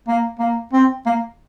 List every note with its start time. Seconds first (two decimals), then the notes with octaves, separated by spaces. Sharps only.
0.08 A#3
0.39 A#3
0.73 C4
1.06 A#3